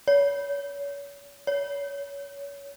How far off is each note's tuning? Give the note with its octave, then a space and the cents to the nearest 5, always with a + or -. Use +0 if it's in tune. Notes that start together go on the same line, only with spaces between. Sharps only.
C#5 +35
C#5 +25